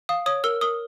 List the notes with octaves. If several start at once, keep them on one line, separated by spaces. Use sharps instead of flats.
F5 D#6
C#5 D#6
A#4 E6
A#4 D#6